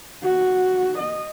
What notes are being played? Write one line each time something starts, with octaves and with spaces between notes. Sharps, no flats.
F#4
D#5